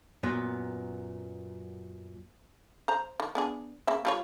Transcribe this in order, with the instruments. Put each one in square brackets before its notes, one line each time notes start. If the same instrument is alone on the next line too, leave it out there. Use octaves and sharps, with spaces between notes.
[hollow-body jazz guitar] F#2 A#2 B3
[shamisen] C5 A#5
D#3
B3 D4 G#4
C#3 A#3 E5
G3 F4 C#5